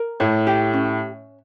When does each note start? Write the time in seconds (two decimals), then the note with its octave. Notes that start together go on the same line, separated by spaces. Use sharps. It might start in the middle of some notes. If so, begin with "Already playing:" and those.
Already playing: A#4
0.20 A2 C#5
0.47 G4
0.73 C#4